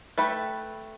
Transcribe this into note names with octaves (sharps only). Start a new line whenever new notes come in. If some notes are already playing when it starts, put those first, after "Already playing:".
A3 B4 G5 B5